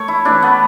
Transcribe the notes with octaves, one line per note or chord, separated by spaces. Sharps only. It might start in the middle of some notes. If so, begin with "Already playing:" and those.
Already playing: A3 C#5
E4
C#3 E3 A3 D4
B3